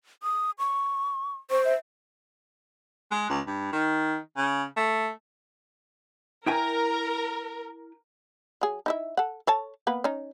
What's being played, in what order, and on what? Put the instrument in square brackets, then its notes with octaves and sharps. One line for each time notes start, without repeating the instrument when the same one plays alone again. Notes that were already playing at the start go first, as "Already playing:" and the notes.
[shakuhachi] D#6
C#6
[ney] C5 [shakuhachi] C#6
[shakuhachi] E5
[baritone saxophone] G#3
C#2
G2
D#3
C#3
A3
[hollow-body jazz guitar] E4 G5 G#5 [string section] A#4
[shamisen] F#3 G#4
D#4 E4 E5
A4 F#5
A4 C#5 A5
A#3 B3 B4
C#4 D#4